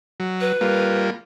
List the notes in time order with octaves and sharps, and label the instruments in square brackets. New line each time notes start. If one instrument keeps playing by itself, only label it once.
[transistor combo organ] F#3
[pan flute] B4
[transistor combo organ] G3 A#3 F4